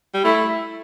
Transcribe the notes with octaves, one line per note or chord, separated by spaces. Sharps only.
G3
A3 E4